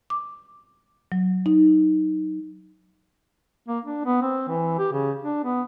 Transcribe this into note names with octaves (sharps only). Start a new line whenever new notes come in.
D6
F#3
D#4
A#3
D4
B3
C4
E3
G4
C#3
D4
B3